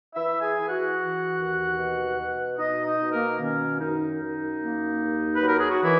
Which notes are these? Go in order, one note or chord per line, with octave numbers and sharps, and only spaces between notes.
E3 E4 E5
G#4 G#5
E3
F#4 F#5
E3
D#2
B2
B2
B2 D#4 D#5
D#4 D#5
B2
A#3 A#4
D#3 C#4
F#2 D#4
F#2
A#3
D#2
B4
F#3
A#4
G#4
F#4
D#3 E3 E4